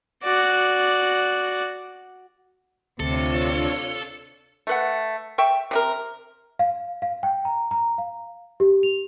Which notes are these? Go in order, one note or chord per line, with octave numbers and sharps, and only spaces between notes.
F#4 D5
D2 C3 D4 F4 A4 C#5
A3 B4 F#5
E5 G5 C#6
C3 D4 A#4
F5
F5
G5
A#5
A#5
F5
G4
F7